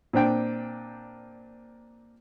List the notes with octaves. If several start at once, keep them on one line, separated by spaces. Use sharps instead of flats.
A#2 C4 D4 G5